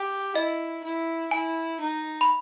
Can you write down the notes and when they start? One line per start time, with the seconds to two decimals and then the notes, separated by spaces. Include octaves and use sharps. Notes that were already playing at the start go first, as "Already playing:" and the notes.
Already playing: G4
0.35 E4 D#5
0.84 E4
1.31 E4 G#5
1.80 D#4
2.21 B5